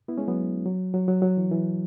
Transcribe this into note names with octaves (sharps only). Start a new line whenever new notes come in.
B3 E4
G#3 C#4
F#3 B3
F#3
F#3
F#3
F#3
E3
E3